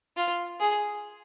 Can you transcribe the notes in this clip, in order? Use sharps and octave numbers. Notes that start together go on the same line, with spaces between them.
F4
G#4